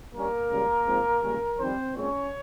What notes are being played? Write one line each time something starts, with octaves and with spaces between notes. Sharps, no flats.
G2 G3 A#3 C#4 A#4
C#2 C#3 G3
G#2 F3 G#3 C4
C#2 C#3 G3 A#3 C#4
F2 D#3 G3 C4 C5
A#2 G#3 C4 C#4 C#5